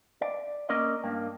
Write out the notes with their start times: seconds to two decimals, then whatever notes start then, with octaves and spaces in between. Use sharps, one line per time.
0.22 D5
0.69 A#3 C#4 A#4 D5 D#5
1.04 G2 A#3